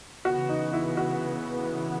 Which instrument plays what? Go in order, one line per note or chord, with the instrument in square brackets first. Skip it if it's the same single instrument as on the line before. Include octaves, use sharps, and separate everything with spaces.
[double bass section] C#3 E3 B3 [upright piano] F#4
[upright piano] D#4
E4
F#4